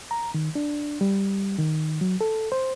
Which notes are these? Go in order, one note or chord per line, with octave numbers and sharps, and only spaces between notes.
A#5
D#3
D4
G3
D#3
F#3
A4
C5